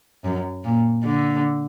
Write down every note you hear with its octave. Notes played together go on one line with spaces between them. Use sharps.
F#2
A#2
D3